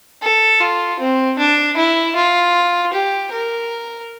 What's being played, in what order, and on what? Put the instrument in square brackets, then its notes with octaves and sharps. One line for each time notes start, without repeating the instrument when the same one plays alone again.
[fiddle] A4
F4
C4
D4
E4
F4
G4
A#4